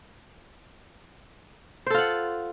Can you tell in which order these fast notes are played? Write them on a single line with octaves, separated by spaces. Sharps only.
C5 A4 F4 F#5